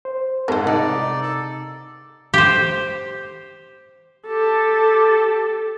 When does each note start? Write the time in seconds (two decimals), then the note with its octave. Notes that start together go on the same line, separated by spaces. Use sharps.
0.05 C5
0.48 C2 G#2 A#4 C5 F#5 A5
0.67 C3 D#4 D5 F#5 A#5 D6
1.22 A4
2.34 G4 C5
4.27 G4 A4